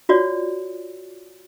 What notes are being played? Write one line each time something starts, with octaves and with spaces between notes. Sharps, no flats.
F4 F#4 C#5 D5